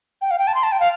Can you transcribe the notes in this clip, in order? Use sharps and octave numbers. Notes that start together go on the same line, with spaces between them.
G5
F5
G5
A5
C6
A5
G5
F5